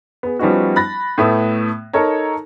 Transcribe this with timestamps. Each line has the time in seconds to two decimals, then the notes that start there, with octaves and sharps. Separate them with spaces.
0.23 B3 G#4
0.39 F3 G3 B3 C#4 D#4 F#4
0.76 B5 F#6 A6 A#6
1.18 A2 A3 B3 D#6
1.93 D#4 A4 A#4 C#5 A#5